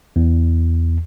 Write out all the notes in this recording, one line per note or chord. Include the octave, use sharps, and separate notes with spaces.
E2